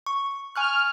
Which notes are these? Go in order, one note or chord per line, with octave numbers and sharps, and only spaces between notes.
C#6
G#5 C#6 F6 F#6